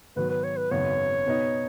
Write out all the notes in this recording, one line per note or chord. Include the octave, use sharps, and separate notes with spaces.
G#2 D#3 F#3 B3 B4
B4
C#5
B4
G#1 F#2 C#3 B3 C#5
B2 B3 D#4